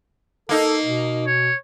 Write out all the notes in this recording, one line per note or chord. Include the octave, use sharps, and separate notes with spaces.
A#3 D#4 A4
B2
C#5